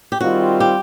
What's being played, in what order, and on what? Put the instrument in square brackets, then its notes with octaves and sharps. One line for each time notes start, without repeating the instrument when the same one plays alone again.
[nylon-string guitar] G4
[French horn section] D#3 G3 C4 F4 [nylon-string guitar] F#4
[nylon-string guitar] G4